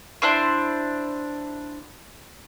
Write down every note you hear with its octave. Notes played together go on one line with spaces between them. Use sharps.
D4 E4 C5 C6